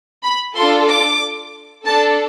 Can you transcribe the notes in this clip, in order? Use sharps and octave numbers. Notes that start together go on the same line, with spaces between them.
B5
D4 F4 A4 C6
D6
D4 A4 A5